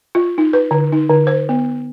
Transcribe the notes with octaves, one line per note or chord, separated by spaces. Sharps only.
F4
D#4
B4
D3
D#4
D3
C5
B3